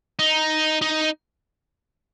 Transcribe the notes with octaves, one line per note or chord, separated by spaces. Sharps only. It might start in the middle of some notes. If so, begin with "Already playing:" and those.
D#4
D#4